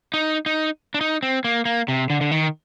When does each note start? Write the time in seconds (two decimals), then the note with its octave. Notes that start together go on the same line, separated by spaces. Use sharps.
0.14 D#4
0.46 D#4
0.94 D4
1.01 D#4
1.23 C4
1.44 A#3
1.65 A#3
1.88 C3
2.10 D3
2.21 D3
2.31 D#3